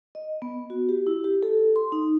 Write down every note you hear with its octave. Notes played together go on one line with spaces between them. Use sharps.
D#5
B3
F#4
G4
E4
G4
A4
C6
D#4